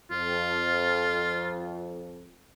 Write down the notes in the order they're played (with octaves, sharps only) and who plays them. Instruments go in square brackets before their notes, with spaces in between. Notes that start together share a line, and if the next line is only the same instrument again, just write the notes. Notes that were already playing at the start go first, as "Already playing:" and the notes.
[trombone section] F2 [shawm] F4